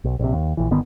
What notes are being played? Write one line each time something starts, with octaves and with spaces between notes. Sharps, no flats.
B1
A#1 C3
D#2
A#1 E3
G1 D3 D#3 B3